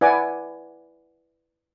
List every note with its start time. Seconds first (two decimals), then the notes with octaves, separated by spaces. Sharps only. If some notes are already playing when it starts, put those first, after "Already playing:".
0.01 E4 B4 D5 F#5 G#5 D6